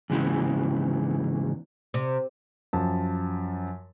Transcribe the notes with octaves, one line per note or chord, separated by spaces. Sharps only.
E2 G#2 C#3 E3
C3
F#2 F3 A5